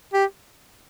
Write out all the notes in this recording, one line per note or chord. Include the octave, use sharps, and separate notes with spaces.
G4